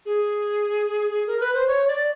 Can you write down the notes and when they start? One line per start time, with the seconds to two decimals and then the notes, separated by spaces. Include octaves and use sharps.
0.06 G#4
1.27 A#4
1.40 B4
1.54 C5
1.67 C#5
1.88 D5